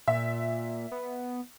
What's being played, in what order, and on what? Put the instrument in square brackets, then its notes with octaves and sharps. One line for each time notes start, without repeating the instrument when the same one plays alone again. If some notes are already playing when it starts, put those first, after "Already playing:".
[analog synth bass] A#2 [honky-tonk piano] E5
[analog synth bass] B3